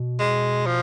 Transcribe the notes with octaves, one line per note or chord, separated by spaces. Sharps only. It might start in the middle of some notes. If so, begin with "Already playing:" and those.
Already playing: B2
G#3
F3